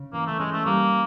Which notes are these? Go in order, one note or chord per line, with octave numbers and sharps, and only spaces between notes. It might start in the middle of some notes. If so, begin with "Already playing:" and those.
Already playing: C#3
E3 A#3
A3
G#3 C#4
A3
G3 A#3